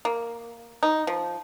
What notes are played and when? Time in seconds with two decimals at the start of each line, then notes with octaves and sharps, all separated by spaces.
0.05 A#3
0.83 D#4
1.07 F3